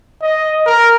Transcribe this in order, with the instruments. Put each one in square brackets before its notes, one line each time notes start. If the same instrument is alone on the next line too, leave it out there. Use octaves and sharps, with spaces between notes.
[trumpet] D#5
A#4